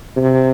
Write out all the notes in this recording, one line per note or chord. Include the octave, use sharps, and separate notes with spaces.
C3